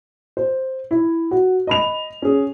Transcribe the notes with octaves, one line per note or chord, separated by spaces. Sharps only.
C5
E4
F#4
D#5 B5 F7
C#4 G#4